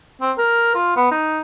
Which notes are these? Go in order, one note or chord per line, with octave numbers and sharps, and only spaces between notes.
C4
A#4
F4
B3
D#4